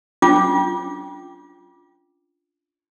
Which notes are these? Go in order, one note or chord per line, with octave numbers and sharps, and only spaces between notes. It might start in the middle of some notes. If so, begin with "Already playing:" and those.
C#4 D4 F4 D6